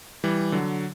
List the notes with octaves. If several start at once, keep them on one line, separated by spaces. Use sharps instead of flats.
E3 G3
D3 F#3